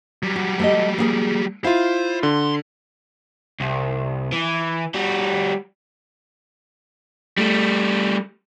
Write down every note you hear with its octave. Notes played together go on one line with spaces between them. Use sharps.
F#3 G3
F#4
A3 G4 D#5
A#3 G#4 A#4
E4 F4 C5 F5
D3 C6
C2
E3
G3 F#4
G3 A3